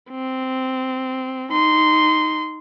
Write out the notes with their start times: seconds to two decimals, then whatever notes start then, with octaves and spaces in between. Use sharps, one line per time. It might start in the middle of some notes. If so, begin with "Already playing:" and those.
0.11 C4
1.51 D#4 C6